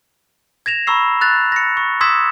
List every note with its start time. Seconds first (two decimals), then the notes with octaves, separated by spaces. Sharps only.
0.66 G#6 A#6 E7 F7
0.87 A#5 B5 C#6 E6 C7
1.21 F#6 A6 F7
1.52 A#6 C#7
1.77 C#6
2.01 C6 D#6 E6 G#6 B6 E7